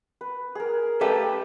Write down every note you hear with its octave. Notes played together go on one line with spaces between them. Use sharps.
B4
G#4 A#4
G4 A4 B4 E5